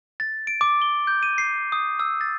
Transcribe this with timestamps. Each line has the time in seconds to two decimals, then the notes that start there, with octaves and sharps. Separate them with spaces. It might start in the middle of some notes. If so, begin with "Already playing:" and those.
0.20 A6
0.47 D7
0.61 D6
0.82 G7
1.07 G6
1.23 D#7
1.38 C7
1.72 D#6
2.00 E6
2.21 A6